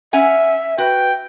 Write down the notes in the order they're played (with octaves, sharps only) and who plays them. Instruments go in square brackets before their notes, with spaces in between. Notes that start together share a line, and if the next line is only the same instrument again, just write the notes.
[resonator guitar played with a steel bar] C#4 F#5 G#5 [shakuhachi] E5
[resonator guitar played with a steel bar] F#4 [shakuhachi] B4 [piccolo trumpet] G5